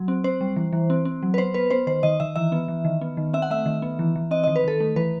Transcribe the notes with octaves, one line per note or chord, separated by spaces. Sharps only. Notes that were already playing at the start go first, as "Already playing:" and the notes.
Already playing: F#3
C4
C4 C5
G3
E3
E3
C4
C4
F#3
B4
B3 C5
B3 B4
B3 C5
D#3 C5
D#3 D#5
D#3 E5
E3 E5
B3
E3
D#3
B3
D#3
C4 E5
F#5
A3 E5
D#3
B3
E3
E3
C4 D#5
D#3 D#5
B4
D#3 A4
A3
E3 B4